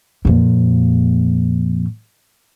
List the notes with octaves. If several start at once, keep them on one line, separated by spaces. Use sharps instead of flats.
F2 A#2